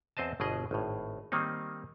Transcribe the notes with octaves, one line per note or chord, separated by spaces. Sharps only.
E2 C4 C5 D#5 A5
G1 B2 G#4 D#5
G#1 A2
D#3 G3 A#3 C4 D#4